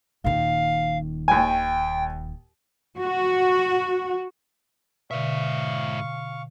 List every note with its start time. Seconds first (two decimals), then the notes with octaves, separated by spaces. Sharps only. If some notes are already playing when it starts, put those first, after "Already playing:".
0.24 D#1 D#3 F5
1.28 D#2 G5 G#5
2.98 F#4
5.11 G#2 B2 D3 E5 F5 C#6